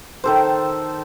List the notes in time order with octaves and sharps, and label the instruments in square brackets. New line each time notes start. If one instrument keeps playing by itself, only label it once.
[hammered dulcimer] D#3 A4 C5